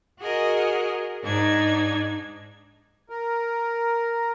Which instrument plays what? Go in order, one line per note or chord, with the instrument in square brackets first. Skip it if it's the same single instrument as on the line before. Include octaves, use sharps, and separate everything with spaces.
[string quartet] F#4 G#4 A#4 D#5
G#2 D4 D#4 G#6
[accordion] A#4